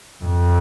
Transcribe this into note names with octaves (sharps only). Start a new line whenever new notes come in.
F2